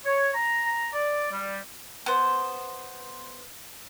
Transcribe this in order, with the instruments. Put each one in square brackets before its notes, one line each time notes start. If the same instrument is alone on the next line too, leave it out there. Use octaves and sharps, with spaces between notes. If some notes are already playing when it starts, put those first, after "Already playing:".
[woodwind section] C#5
A#5
D5
G3
[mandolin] B3 C5